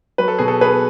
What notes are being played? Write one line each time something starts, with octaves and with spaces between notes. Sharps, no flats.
F#3 B4
A4
B2 G#4
A4
B3 G#4 B4